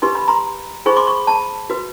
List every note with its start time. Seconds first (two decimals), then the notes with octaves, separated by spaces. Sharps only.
0.02 D#4 G4 B4 C6
0.15 B5
0.28 A#5 C6
0.86 D#4 G#4 C5 B5 C#6
0.96 C6 D6
1.07 B5 C#6
1.27 A5 B5
1.70 F#4 B4